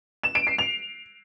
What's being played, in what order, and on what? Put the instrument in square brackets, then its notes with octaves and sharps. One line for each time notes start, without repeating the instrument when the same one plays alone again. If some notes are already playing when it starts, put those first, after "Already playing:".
[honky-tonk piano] E7
D7
C7
F7